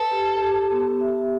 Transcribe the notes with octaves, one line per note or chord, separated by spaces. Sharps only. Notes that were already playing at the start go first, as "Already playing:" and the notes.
Already playing: A4 B4
G4
G4
B3
E5